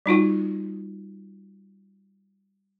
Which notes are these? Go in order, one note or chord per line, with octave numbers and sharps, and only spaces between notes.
G3 D#4 F4 F#4